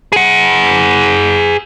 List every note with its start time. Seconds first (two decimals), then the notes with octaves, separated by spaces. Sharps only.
0.12 G#4 F#5